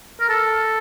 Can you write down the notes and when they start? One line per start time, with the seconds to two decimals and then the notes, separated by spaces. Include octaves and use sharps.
0.20 A#4
0.29 A4